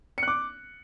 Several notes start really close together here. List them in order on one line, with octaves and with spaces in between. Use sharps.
C#7 F#6 D6